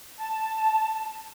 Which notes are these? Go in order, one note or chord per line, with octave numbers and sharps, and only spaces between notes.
A5